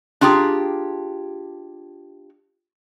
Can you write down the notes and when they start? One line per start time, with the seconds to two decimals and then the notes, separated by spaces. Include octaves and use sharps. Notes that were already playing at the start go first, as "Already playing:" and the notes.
0.21 D4 F4 G4 G#4 A#5